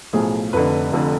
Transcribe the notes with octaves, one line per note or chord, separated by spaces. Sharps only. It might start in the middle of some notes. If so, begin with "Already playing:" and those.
B1 A2 F3 G#4
F1 F2 D3 B4
F1 F2 D3